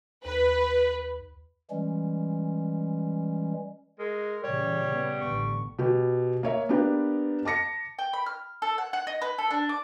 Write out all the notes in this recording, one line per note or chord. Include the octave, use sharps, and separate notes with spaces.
D#2 B4
E3 G3 G#3 C#4
G#3 A#4
A#2 C#3 E3 G3 C#5
B3
A1 D3 C#6
B2 G4
A#3 C#5 E5
A#3 B3 D4 G4 B4
A5 D6 A#6 C#7
G5
B5
F6
A4
F#5
F#5
D#5
B4
A4
D4
D6